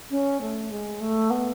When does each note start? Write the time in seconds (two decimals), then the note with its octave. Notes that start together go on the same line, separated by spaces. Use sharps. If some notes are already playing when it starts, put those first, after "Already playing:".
0.10 C#4
0.41 A3
0.71 G#3
1.00 A3
1.30 B3